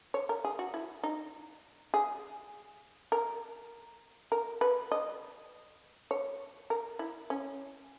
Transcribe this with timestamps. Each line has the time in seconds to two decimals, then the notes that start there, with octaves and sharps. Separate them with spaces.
0.14 C#5
0.29 A#4
0.45 G#4
0.59 F#4
0.74 E4
1.03 D#4
1.94 G#4
3.12 A#4
4.32 A#4
4.61 B4
4.92 D#5
6.11 C#5
6.70 A#4
6.99 E4
7.30 C#4